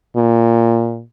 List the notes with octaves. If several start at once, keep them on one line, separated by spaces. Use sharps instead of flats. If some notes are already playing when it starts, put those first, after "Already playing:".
A#2